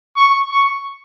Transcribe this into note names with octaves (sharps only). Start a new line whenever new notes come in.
C#6
C#6